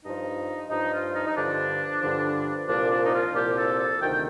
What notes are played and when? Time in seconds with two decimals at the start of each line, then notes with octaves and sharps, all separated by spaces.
0.04 G2 F3 D#4
0.70 G2 F3 D#4
0.92 F4
1.15 D#4
1.26 D#4
1.36 G2 D3 F3 D4
2.03 G2 D3 F3
2.69 C2 A#2 F3 D4
2.90 D4
3.06 D#4
3.13 F4
3.35 C2 A#2 F3 G4
3.57 A4
3.79 A4
4.01 D2 C3 D#3 G5